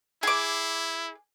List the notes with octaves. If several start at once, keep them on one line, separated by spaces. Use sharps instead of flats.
E4 G#4 D6